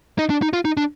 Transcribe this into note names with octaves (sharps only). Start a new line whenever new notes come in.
D#4
D4
D#4
F4
D#4
D4